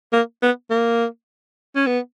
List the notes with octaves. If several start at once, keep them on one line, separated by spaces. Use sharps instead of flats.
A#3
B3
A#3
C#4
B3